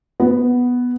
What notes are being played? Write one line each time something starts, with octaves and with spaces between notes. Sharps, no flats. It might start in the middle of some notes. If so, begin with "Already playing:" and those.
B3